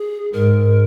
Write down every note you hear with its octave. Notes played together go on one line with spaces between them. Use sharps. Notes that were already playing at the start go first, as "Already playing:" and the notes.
Already playing: G#4
G#2 A#4